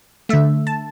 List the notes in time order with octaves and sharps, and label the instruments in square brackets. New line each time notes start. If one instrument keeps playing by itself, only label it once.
[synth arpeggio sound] D3 A3 E5
A5